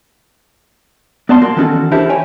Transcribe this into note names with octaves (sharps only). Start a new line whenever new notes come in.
B3 D5 A5 C6
A#3 F#4
D#3 E3 C#4 F#4 A4
D4 E4 G4 A4 A#4 C5
C#5 G5 G#5